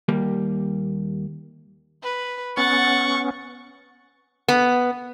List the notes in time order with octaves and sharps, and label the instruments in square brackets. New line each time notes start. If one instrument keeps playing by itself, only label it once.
[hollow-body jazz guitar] D#2 G3 A#3
[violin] B4
[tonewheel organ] B3 C#4 [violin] F#5 A6 [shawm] C#6
[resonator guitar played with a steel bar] B3